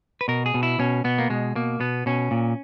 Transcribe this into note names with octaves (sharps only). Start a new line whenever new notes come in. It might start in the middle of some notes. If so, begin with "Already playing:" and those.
B4
B2 A#4
G#4
B2
E4
B2 C#4
B2 B3
A#3
B2 G#3
B2 A#3
B2 B3
B2 C#4
A#2